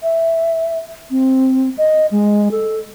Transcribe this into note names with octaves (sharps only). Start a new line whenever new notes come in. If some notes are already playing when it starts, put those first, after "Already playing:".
E5
C4
D#5
G#3
A4